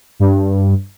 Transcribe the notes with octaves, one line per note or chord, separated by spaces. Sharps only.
G2